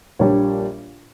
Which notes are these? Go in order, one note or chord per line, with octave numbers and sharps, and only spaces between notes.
A#1 A#2 G3 D4 C#5